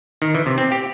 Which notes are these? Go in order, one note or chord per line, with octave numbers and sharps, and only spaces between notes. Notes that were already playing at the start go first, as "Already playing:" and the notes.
D#3
E3
C3
C4
G4